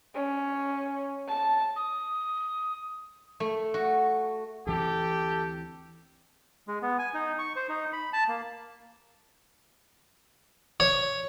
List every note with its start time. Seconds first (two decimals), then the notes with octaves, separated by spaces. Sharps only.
0.14 C#4
1.28 A5
1.76 D#6
3.40 A3
3.74 F#4
4.67 D2 E3 C4 G4 A4
6.68 G#3
6.82 B3
6.99 G#5
7.14 D#4
7.39 C#6
7.56 C5
7.69 D#4
7.93 B5
8.13 A5
8.28 A#3
10.80 C#5